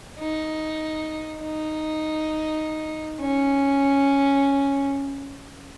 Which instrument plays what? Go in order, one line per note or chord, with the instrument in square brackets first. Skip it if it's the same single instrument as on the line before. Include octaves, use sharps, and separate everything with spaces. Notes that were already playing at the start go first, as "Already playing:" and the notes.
[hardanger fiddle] D#4
D#4
C#4